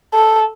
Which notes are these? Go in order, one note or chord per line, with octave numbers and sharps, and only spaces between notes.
A4